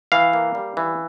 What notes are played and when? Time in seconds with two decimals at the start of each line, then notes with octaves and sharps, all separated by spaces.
0.12 E3 F5
0.33 A#3
0.55 G3
0.77 E3